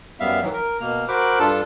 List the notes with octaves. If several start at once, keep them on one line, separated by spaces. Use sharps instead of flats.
F#2 G3 B3 E5 F5
G#2 D#3 E3 F#3
A#4
B2 A#3 F6
F#4 A#4 C5 B5 D6 F#6
G2 D4 F4 A4 A5